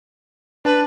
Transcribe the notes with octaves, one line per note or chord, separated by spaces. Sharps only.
D4 B4 A5